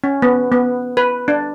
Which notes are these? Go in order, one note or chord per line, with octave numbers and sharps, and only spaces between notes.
C#4
B3
B3
B4
D4